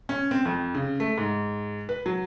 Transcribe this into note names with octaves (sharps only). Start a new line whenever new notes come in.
C#4
C4
F2
C#3
A3
G#2
B4
F#3